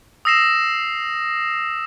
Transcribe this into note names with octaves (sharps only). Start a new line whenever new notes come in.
D#6 E6 A#6 C7 E7